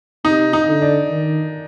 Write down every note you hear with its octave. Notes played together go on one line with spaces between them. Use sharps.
C3 D#4
D#4
D3
D4
D#3